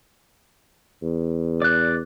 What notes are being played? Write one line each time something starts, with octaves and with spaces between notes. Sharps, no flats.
E2
D5 F#6